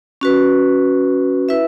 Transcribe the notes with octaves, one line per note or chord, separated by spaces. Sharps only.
C#4 F#4 B4
E4 B4 E5